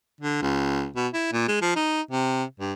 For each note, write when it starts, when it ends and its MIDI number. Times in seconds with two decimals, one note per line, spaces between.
0.20 0.39 50
0.42 0.87 37
0.96 1.08 47
1.13 1.29 64
1.32 1.47 46
1.48 1.59 56
1.61 1.73 53
1.76 2.01 63
2.11 2.44 48
2.60 2.73 43